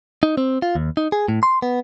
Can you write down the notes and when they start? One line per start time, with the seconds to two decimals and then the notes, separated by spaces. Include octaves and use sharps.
0.23 D#4
0.37 C4
0.62 F4
0.75 D#2
0.97 D#4
1.12 G#4
1.28 A2
1.43 C6
1.62 B3